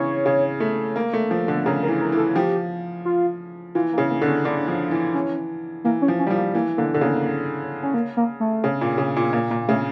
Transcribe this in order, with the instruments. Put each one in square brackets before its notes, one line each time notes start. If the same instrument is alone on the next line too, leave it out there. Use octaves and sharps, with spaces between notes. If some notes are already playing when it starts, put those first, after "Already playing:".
Already playing: [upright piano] C#3 E3 [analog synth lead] C#5
[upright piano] C#3
A3
A#3
A3
F3
D3
[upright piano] C#3 [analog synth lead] A#4
[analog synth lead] A#4
[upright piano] E3
[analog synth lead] A#4
[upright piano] E3
[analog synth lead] A4
[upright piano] F3 [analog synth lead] G4
[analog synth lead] F4
[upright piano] E3 [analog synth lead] F4
[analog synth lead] A#3
[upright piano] C#3
[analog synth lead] A#3
[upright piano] D3
[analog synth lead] C#4
[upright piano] D3 [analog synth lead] D4
[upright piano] F3
E3
[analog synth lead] C#4
[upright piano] E3 [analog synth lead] A#3
[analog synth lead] C#4
[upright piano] F3
[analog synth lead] C#4
[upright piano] G3
F3
[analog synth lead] A#3
[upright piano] E3 [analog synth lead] A#3
[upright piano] D3 [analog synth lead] A#3
[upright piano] D3
[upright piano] C#3 [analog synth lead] A#3
[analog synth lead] C#4
A#3
A#3
A3
[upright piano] C#3
A#2
C#3
A#2
[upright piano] A#2 [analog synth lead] A#3
[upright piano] A#2 [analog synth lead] A#3
[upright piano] C#3 [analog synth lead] A3